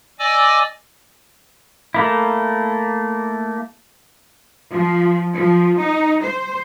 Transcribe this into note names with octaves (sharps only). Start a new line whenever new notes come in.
D5 D#5 G#5 D6 E6
A3 A#3 E4
F3
F3
D#4
C5